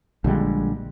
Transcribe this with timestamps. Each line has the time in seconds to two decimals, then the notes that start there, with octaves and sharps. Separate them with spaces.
0.24 A#1 D3 G3 G#3